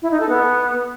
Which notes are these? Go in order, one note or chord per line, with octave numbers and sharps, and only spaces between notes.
E4
D#4
A4
B3